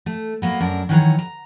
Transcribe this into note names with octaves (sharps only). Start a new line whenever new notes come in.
A3
F#3 A#3 B3
F#2 D4 A#4
D#3 E3 F#3 C#5 A#5
A#5